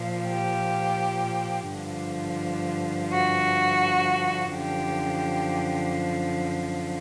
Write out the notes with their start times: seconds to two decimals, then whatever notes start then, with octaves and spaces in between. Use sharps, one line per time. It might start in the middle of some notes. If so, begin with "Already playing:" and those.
Already playing: A#2 F3
0.28 G4
1.69 G2 D3 F3
3.12 F#4
4.53 F#2 D3 F3 G4